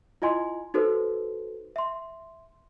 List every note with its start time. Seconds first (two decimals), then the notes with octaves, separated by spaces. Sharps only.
0.22 E4 F4 D#5 G#5 C6
0.74 D#4 F#4 A4 B4 C5
1.76 E5 C6